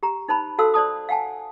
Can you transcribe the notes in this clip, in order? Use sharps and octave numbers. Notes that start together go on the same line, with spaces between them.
G4 A#5
D#4 C5 A5 B5
F#4 A4 C5 F5 A5 E6
C5 D5 A5 D#6
F5 F#5 G#5 A5